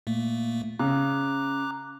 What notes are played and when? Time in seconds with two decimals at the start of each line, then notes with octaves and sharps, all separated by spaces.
0.07 A#2 A3 A#3
0.79 C#3 A#5 D6 F#6